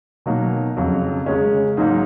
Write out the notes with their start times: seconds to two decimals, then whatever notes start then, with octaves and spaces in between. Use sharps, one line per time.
0.26 B2 F#3 A#3 D#4
0.77 F2 C#3 F#3
1.26 C#3 G#3 C#4
1.77 G#2 F#3 A#3 D#4